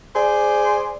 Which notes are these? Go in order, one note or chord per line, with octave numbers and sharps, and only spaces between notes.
G#4 C5 D5